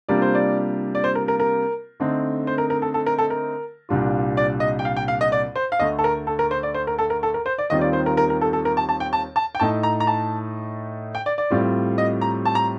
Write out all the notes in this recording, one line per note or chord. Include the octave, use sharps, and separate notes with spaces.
C3 G3 A#3 D4 F4 D5
C5
D5
D5
C5
A#4
A#4
A#4
D3 A3 C4 D#4
C5
A#4
A#4
A4
A4
A#4
A4
A#4
C2 A#2 G3 D4 F4
D5
D#5
G5
F5
G5
F5
D#5
D5
C5
F5
D2 D3 A3 D#5
A4
A#4
A4
A#4
C5
D5
C5
A#4
A4
A#4
A4
A#4
C5
D5
D#2 D#3 G3 C4 F4 D#5
D5
C5
A#4
A#4
A#4
A4
A4
A#4
A5
A5
G5
A5
A5
G5
A2 A3 D#4 A5
A#5
A#5
A5
G5
D5
D5
A2 G3 C4 F4
D#5
A#5
A5
A#5